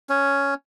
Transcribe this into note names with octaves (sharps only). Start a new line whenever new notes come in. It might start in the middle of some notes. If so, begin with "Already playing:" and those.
C#4